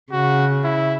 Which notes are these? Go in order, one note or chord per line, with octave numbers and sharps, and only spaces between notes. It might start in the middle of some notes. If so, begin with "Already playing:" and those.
C#3 F#4
E4